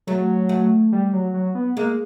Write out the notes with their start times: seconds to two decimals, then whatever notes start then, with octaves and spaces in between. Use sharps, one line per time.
0.07 F#3 A3
0.49 A3
0.92 G3
1.13 F#3
1.34 F#3
1.55 B3
1.77 G#3 A#3